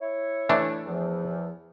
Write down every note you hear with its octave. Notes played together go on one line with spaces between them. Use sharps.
E4 C#5
E3 A3 D4
E2 F3